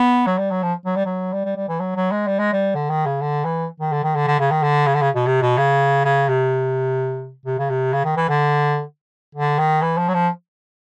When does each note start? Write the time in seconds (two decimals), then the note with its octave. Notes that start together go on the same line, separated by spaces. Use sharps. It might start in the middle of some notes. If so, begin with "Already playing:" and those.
Already playing: B3
0.27 F#3
0.39 G3
0.51 F#3
0.63 F3
0.86 F#3
0.96 G3
1.06 F#3
1.33 G3
1.45 G3
1.56 G3
1.69 E3
1.81 F#3
1.96 F#3
2.12 G#3
2.27 G3
2.39 G#3
2.53 G3
2.75 D3
2.90 D#3
3.06 C#3
3.22 D3
3.45 E3
3.80 D#3
3.93 D3
4.04 D#3
4.16 D3
4.28 D3
4.40 C#3
4.51 D#3
4.63 D3
4.87 C#3
4.95 D3
5.02 C#3
5.15 B2
5.26 C3
5.42 B2
5.58 C#3
6.05 C#3
6.28 C3
7.46 C3
7.59 C#3
7.70 C3
7.93 C#3
8.05 D#3
8.17 E3
8.29 D3
9.36 D3
9.59 D#3
9.82 E3
9.98 F3
10.08 F#3
10.14 F3